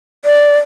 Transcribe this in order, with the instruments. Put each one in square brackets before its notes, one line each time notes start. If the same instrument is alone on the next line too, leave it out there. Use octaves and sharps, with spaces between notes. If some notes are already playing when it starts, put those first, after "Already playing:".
[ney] D5